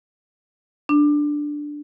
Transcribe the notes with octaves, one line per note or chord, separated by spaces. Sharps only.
D4